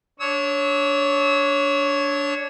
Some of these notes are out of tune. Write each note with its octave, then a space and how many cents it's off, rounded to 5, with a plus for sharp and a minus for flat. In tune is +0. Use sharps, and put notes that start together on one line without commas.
D4 -20 C#5 +0 E6 -35